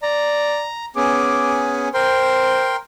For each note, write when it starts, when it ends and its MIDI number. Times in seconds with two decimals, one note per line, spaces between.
0.02 0.67 74
0.02 0.85 82
0.96 1.89 59
0.96 1.89 61
0.96 1.89 68
0.96 1.62 86
1.94 2.76 70
1.94 2.76 72
1.94 2.76 79
1.94 2.76 84